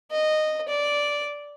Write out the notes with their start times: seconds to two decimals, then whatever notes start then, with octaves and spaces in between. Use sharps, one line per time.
0.11 D#5
0.68 D5